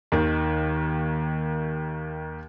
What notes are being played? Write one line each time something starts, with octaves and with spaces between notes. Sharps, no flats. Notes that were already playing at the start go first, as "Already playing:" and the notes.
D#2 D#3